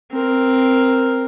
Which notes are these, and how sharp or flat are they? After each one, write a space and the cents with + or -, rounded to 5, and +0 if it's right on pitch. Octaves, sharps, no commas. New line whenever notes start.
C4 +0 A#4 +0